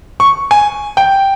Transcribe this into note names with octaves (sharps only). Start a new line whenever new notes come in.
C#6
G#5
G5